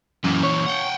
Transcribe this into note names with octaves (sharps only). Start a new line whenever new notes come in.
F#2 A#2 E3
C#5
F#5 G5